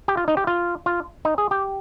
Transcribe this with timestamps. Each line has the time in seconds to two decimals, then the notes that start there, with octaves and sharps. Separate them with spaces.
0.08 G4
0.17 F4
0.28 D#4
0.37 G4
0.47 F4
0.86 F4
1.25 D#4
1.38 G#4
1.51 G4